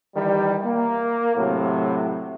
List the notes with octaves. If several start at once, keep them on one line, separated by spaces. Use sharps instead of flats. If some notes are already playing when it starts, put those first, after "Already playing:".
D#3 E3 G3
A#3
A2 C3 F#3